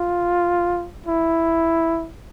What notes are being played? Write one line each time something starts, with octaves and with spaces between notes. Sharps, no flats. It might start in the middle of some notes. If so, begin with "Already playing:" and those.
Already playing: F4
E4